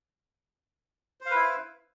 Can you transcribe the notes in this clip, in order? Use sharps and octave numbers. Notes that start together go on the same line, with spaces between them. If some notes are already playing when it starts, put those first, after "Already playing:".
E4 B4 C5 F5